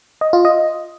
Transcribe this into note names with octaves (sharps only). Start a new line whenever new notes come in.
D#5
F4
D#5